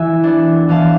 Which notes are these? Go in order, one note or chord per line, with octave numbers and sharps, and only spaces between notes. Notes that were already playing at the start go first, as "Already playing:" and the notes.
Already playing: E3 E5 G#5
B3 D4
E3 F5 A5